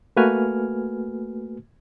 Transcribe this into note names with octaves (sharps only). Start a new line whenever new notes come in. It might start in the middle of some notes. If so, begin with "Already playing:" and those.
A3 A#3 F#4 B4 G#5 F6